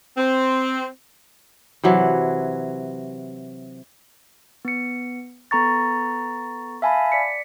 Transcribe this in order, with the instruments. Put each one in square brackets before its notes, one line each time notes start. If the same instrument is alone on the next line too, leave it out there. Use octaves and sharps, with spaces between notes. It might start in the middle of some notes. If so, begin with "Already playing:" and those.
[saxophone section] C4
[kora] C3 E3 F#3
[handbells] B3 C#7
B3 A4 A#5 C#6 A6
E5 F5 G#5 A5 B5
D5 B6 C#7